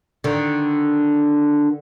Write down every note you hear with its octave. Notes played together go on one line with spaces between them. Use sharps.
D3 D#3